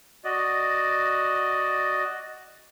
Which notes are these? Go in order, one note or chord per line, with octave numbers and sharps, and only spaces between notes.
F#4 D5 D#5